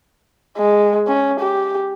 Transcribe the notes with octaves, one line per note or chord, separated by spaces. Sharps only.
G#3
C#4
G4